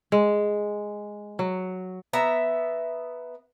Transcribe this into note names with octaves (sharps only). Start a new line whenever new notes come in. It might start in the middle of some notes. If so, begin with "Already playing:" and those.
G#3
F#3
B3 E5 A#5